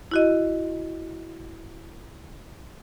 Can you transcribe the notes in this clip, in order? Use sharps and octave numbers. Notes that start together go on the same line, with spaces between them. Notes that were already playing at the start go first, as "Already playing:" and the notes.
E4 F#4 D#5